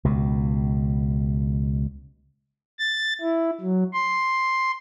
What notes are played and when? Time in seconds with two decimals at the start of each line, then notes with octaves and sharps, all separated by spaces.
0.05 C#2 B2
2.79 A6
3.21 E4
3.61 F#3
3.93 C6